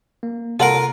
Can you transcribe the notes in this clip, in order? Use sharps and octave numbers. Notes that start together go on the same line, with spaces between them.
A#3
C3 F4 A4 A#4 F#5